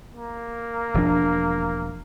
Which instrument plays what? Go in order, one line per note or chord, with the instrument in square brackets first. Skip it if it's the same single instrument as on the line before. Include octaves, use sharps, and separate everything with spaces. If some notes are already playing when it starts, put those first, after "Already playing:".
[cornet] A#3
[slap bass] E1 F3 D4